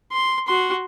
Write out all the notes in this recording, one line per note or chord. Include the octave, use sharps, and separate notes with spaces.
C6
F#4 C6